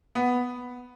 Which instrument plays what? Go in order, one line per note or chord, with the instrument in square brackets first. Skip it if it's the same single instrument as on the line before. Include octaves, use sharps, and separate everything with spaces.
[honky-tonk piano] B3